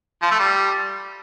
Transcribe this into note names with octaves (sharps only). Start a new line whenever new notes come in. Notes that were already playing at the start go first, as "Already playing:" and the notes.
F3
A3
G3